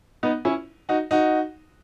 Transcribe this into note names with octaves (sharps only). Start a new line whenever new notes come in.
B3 D#4
C#4 E4
D#4 F#4
D#4 F#4